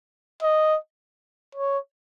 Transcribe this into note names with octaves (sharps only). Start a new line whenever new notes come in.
D#5
C#5